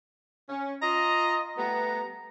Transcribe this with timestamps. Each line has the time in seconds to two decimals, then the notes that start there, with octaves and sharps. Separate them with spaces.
0.49 C#4
0.82 F4 D#5 A#5
1.58 G3 A3 B3 A#5